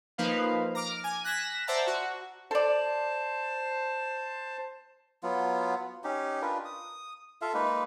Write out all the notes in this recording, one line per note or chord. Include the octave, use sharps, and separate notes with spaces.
F3 A#3 D#4 B4 F5
A#5 D6 F6
G#5
F#6 A#6 B6 E7
C5 D5 E5 F#5 A5 A#5
F#4
A4 C5 D5 A5
F#3 B3 F4
C#4 D#4 G4
D4 F4 A#4 B4
D#6
F4 A4 E5 F5
G#3 A#3 D#4 B4